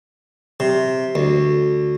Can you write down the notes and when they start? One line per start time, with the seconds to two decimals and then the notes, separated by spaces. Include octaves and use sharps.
0.60 C3
1.15 D2